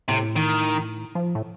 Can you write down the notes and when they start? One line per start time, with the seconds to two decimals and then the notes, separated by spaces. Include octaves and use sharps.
0.08 A2 C3
0.36 D#3
1.15 F3
1.35 A2